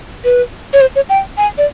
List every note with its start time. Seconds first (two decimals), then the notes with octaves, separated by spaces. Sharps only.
0.25 B4
0.73 C#5
0.81 C5
0.96 C#5
1.09 G5
1.38 G#5
1.58 D5